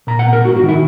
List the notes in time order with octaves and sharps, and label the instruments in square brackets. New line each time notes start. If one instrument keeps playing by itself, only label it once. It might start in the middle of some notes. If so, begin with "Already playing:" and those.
[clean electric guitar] A#2 A#5
F#5
B3
A#4
G#2 F#4
F#4
D#3
E4